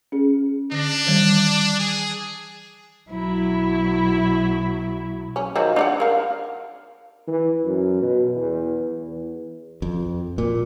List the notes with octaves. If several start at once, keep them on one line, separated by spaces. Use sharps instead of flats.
C#4 G#4
D3 D4 A#6
D#3 E3 G3
G#4
B1 F#3 E4
C#4
D#3 F3 F#3
D4 D5 F#5
A#4 F5
E3
F#2
B2
E2
E2
F2
A#2